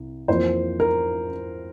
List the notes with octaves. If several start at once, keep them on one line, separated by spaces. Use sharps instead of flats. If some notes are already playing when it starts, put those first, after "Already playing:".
Already playing: C2
F2 E3 A#3 C5
A#4